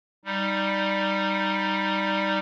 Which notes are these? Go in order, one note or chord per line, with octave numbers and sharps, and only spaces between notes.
G3 D#4